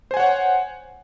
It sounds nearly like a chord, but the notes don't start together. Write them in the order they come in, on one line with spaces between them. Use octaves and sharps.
C5 G#5 F#5 C#5